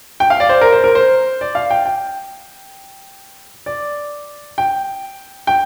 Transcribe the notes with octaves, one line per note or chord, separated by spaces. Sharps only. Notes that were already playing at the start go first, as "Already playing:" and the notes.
G5
F5
D5
C5
A#4
C5
A#4
C5
D5
F5
G5
G5
D5
G5
G5